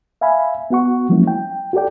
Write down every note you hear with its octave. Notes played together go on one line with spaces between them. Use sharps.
E5 F5 G#5 B5
B3 F#4 F#5 C#6
F3 F#3 G#3 A#3 C#4 E4
G5
F#4 G4 A4 D5 G5